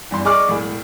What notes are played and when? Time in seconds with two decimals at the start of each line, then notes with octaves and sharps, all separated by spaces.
0.11 E2 G2 C6
0.25 G#4 D5 D#5 C#6 D6 F6
0.48 E1 A2